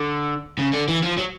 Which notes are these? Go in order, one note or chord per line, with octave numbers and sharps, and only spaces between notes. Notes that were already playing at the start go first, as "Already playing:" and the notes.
Already playing: D3
C#3
D3
E3
F3
F#3